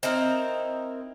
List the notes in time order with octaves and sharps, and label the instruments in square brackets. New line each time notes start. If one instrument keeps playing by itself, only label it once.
[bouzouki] C4 D#4 E4 A#4